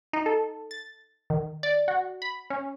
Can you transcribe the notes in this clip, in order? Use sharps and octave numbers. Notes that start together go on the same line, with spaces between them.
D#4
A4
A6
D#3
D5
F#4
B5
C#4